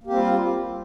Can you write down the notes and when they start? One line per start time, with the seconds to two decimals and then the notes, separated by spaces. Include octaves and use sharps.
0.04 A#3
0.07 G4
0.10 C4
0.13 G3
0.17 F4